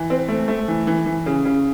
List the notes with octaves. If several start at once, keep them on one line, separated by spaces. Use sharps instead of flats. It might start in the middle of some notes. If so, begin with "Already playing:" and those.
Already playing: E3
C4
A3
A3
E3
E3
E3
C#3
C#3